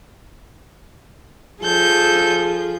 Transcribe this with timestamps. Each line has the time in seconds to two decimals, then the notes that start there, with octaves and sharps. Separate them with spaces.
1.63 F3 G#4 A4 G6